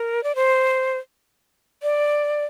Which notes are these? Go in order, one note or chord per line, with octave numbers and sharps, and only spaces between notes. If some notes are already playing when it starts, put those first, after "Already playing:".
Already playing: A#4
D5
C5
D5